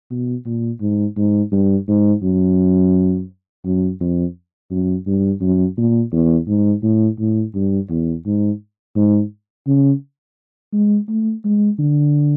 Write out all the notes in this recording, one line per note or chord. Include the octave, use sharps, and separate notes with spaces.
B2
A#2
G#2
G#2
G2
G#2
F#2
F#2
F2
F#2
G2
F#2
A#2
E2
G#2
A2
A2
G2
E2
G#2
G#2
C#3
G#3
A3
G#3
D3